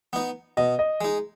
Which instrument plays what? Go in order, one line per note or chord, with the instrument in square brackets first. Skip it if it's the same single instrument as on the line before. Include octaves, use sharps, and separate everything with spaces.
[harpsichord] B3 D#4
[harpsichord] B2 [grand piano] D#5
[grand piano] D#5
[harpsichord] G#3 D#4